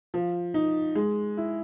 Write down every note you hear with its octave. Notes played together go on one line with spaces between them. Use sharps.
F3
D#4
G#3
E4